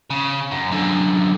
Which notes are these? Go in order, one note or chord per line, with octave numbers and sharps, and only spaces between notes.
C#3
F#2
F#2 D3